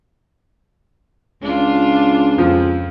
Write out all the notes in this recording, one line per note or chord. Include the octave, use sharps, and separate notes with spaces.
C#2 D4 F4
F2 F3